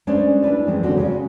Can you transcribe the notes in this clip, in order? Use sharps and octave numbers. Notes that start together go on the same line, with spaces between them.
G#3 C#4 D4 B4 C5
D4 E4 B4 D5
E3 G#3 C4 C#4
E2 D3 D4 F#4 C5
C#3 G#3 F#4